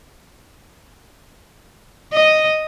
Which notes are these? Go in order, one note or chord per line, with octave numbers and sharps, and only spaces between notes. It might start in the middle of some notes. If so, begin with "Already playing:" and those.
D#5